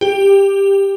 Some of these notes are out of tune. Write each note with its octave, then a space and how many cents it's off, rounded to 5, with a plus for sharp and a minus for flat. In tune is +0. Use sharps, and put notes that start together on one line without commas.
G4 +10